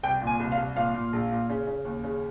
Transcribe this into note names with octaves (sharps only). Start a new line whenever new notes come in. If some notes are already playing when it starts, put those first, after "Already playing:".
C2 G5
A#2
G#5
C2
F5
C2
A#2 F5
A#2
A#1
A#2
C#3
C#3
D#2
C#3